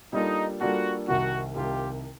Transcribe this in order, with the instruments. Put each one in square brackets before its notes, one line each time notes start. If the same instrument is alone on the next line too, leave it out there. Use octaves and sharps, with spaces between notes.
[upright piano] G3 A#3 D4 F4 A4 [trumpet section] D#4
[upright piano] G3 A#3 D4 F4 A4 [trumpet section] F#4
[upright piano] C2 C3 D#3 [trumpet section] F#4
[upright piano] C2 C3 D#3 [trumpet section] F4 G4